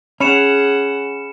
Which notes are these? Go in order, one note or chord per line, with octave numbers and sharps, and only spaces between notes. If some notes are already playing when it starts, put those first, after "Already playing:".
C#4 G#4 F#5 B5 C#7 E7